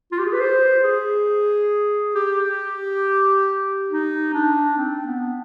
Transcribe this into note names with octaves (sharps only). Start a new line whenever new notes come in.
F4
G4
G#4
B4
C5
G#4
G4
D#4
D4
C4
B3